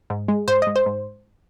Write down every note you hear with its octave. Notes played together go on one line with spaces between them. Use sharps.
G#2
G#3
G#2 C5
G#2 D#5
C5
G#2